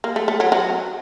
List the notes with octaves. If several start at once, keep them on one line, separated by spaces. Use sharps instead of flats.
A#3
A3
A3
F#3
F#3